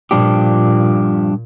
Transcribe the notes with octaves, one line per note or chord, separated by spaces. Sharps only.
G2 A#2 F3 D4 G4